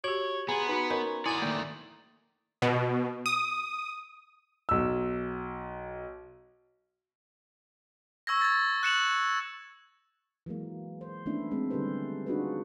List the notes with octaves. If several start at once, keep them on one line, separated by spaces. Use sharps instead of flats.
F#4 G4 C#5 G#6 F#7
B3 G#4 A#5 C6
D#4 F#4 B4
C#4 A#4 B4 D#5
B3 E4 D5 G#5 D#6 A6 F#7
D#3 A3 A#3 D5
B2
D#6
B1 E6
C#6 E6 G#6 A#6
G#6 A6
F#6 C#7 E7 F#7
E3 F#3 G#3 A#3
C5
D#3 A3 B3 C#4 D4 E4
D#3 G#3 C4
D3 G3 G4 A4 B4 C5
D4 D#4 F4 F#4 G#4 B4